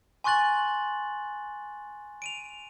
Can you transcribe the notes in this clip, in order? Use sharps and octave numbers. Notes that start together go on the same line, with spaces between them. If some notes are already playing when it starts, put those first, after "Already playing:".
G#5 C6 C#6 F#6 A6 F#7
D7 D#7 F7